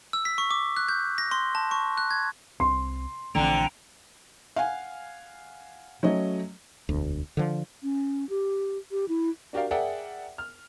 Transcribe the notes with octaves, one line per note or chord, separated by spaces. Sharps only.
E6
B6
C#6
D6
F#6
G6
A#6
C6
A5
C#6
F#6
G#6
C2 C4 C6
A#1 F2 D3 E3 A3 G5 A#5
F5 F#5 G#5
F#3 A3 C#4 D#5
E1 D2
D3 F3
C#4
G4
G4
E4
D4 F#4 G4 A#4 D5 F5
G#4 A#4 D5 E5 F#5 G5
F6